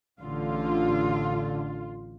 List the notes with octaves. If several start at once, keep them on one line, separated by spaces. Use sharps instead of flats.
A1 D3 F4